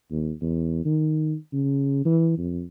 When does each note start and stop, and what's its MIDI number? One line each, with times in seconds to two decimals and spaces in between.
0.11 0.32 39
0.41 0.84 40
0.85 1.35 51
1.53 2.02 49
2.05 2.34 52
2.38 2.62 41